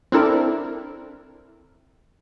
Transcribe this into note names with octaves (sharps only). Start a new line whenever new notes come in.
C4 D4 E4 A4 A#4